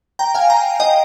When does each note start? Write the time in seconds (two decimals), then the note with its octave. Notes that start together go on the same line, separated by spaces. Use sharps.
0.19 G5 A#5
0.34 F5 G#5
0.50 G5 A#5
0.80 D#5 G5